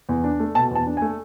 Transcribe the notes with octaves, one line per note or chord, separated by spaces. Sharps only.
E2
D4
A3
B2 A5
E2 A5
D4
G#5
A3